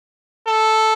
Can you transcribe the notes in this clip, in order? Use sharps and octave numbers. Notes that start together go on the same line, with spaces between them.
A4